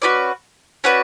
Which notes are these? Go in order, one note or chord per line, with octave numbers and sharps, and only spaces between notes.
C#4 F#4 B4 D5
C#4 F#4 B4 D5